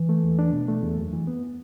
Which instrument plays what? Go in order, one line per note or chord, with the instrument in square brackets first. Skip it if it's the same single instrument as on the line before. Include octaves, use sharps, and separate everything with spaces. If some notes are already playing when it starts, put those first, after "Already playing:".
Already playing: [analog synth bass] E3
[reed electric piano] A3
E2
D4
B2
A3
E2
F#2
E3
B3